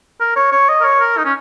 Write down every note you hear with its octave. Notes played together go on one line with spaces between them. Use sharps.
A#4
C#5
C#5
D#5
A#4
C#5
A#4
D#4
C#4